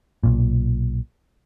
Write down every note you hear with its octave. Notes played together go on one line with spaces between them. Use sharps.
B1 A#2